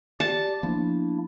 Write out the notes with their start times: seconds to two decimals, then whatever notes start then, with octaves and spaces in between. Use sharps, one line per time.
0.20 G4 D5 A5
0.63 F3 A#3 B3 D4 E4